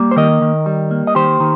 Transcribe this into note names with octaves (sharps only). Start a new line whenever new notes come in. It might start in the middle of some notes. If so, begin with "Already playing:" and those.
Already playing: G3 A#3
C5
D#3 A#4 D#5
D#3
G3
A#3
D#5
D#3 G4 C5
D#3